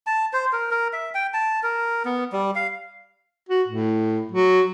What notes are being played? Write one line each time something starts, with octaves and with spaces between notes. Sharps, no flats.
A5
C5
A#4
A#4
E5
G5
A5
A#4
B3
G3
F5
F#4
A2
F#3